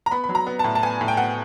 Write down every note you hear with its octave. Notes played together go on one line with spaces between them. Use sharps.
A#5
B3 B5
B5
F#3
A#5
B3
A2 A5
A5
B3 G#5
A2
G5
B3 F#5